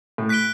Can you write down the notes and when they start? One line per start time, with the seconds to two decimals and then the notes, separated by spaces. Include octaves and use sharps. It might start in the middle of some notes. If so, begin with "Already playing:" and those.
0.18 A2
0.29 F#6 B6 D7 G7